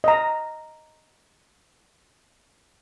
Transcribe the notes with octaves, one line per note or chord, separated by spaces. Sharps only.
D#5 A#5